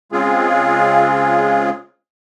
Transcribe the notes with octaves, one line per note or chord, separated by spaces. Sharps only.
C#3 G#3 C4 F4 G#4